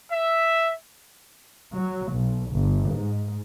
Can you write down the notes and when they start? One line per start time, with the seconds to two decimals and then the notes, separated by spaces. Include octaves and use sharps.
0.12 E5
1.74 F#3
2.11 B1
2.51 G1
2.90 G#2